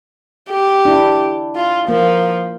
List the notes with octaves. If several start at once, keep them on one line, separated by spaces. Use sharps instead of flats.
G4
D4 E4
F4
F3 A#3